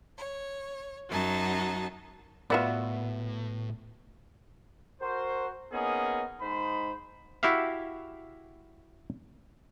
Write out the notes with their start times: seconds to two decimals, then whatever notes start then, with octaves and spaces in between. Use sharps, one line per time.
0.17 C#5
1.09 F#2 F#3 D#4 A5
2.50 A2 B3 F4 F#4 B4 D5 E5
5.02 F#4 A#4 C5
5.72 A#3 B3 C#4 D#4 G#4
6.41 G#2 D#4 C5 B5
7.43 E4 F#4 G4 E5 F5